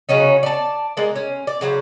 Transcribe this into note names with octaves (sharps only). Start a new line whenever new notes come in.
C#3 F#3 C#4 D#4
D5 D#5 A5
G#3 A#4 D5
C#4
D5
C#3 F#3 B4 C5